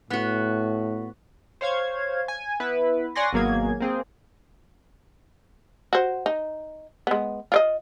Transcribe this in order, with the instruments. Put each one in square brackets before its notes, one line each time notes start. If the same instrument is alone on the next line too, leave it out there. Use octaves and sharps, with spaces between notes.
[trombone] A2 [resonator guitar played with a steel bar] B3 F#4
[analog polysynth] C5 C#5 F5 G#6
G#5
B3 E4 B4
C#5 D5 F#5 G#5 C6 A#6
G#1 B2 F#3 A#3 G#4 G#6
A#3 C4 G#4
[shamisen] F#4 C5
D#4
G#3 B3
F4 D5 D#5